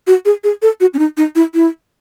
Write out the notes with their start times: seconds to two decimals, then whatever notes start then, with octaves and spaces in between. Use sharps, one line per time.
0.07 F#4
0.25 G#4
0.44 G#4
0.62 A4
0.80 F#4
0.94 C#4
0.99 D#4
1.17 D#4
1.35 E4
1.54 E4